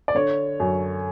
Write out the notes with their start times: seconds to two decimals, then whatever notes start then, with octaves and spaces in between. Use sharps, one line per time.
0.08 D5
0.14 D3 C#5
0.60 F#2